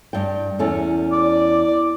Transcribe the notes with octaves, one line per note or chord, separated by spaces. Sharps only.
G2 G5
E2 C#4 A4
D5